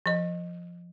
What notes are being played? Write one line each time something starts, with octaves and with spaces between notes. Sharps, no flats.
F3 D#5